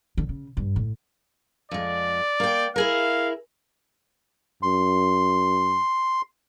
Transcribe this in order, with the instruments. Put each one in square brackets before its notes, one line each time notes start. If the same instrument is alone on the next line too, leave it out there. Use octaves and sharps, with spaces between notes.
[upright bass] D3
C#3
G2
A2
[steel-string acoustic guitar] F2 G#3 [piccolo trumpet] D5
[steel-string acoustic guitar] A#3 G5
[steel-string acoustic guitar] E4 G#4 A#4 [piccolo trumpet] F5
[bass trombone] F#2 [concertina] C6